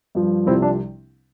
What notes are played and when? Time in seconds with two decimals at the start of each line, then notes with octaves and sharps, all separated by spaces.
0.15 G2 F3
0.46 C2 C3 F3 C4 E4
0.62 D4